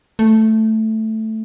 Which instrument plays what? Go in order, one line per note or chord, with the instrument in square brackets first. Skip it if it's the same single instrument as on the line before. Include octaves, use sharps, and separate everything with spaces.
[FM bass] A3